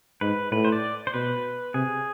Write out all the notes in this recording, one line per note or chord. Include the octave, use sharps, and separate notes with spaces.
G#2 B4
A2 B4
C5
D5
C5
B2 B4
C3 G#4